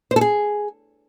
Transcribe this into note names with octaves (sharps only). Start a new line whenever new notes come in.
C5
A4
G#4